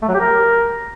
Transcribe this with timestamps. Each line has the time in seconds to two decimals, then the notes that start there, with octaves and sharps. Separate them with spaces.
0.02 A3
0.08 F#3
0.14 G4
0.20 A#4